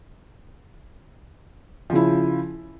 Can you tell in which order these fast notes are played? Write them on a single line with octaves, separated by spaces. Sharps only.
F3 C#3 E4